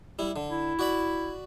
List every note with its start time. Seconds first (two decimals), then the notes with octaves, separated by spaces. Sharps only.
0.19 G3 E4
0.36 D3
0.50 E4
0.79 F#4 D5 B5